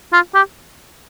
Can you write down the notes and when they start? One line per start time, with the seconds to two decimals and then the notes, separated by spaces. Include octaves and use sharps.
0.13 F4
0.35 G4